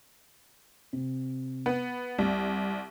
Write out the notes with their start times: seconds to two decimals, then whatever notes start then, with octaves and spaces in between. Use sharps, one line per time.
0.93 C3
1.66 B3
2.18 C2 G3